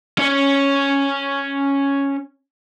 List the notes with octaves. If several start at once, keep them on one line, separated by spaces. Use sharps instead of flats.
C#4 C#5